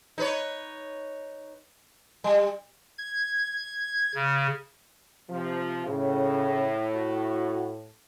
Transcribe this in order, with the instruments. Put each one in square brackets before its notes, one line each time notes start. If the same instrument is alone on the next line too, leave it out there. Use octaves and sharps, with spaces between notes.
[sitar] D#4 B4 C#5
G3
[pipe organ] G#6
C#3
[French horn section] C3 F3
[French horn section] A2 [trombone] C#3
[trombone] F#4